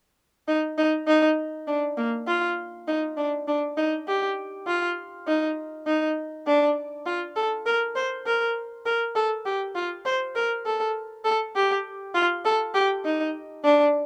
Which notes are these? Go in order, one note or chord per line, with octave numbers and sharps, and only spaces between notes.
D#4
D#4
D#4
D4
A#3
F4
D#4
D4
D4
D#4
G4
F4
D#4
D#4
D4
F4
A4
A#4
C5
A#4
A#4
A4
G4
F4
C5
A#4
A4
A4
G4
F4
A4
G4
D#4
D4